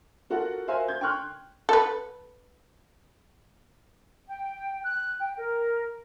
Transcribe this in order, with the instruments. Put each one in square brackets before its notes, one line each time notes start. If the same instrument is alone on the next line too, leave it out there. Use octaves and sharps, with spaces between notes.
[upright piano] F4 F#4 A4 A#4 F#5
F#4 A#4 C5 E5 F5 G#5
G6 G#6
G5 C6 C#6 F6 F#6
[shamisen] A4 B4
[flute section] G5
F#6
G5
A#4